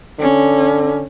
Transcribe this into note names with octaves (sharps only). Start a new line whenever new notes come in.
D3 C#4